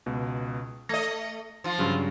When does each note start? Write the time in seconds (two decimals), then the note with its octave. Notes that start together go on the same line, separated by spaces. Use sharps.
0.06 C#2 B2
0.89 A3 D#5 A#6
1.64 F3 F4
1.78 G2 C#3 F#3